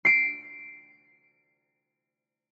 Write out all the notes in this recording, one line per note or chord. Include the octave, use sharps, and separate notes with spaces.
C7 D7